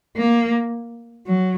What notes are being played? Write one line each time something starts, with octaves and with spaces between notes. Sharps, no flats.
A#3
F#3